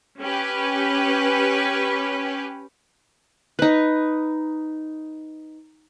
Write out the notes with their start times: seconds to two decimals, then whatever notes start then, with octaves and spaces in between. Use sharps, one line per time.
0.20 C#4 G4 B4
3.59 D#4 B4